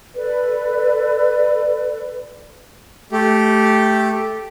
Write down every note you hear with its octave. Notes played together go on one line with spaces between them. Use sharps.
A4 B4 D5
A3 G4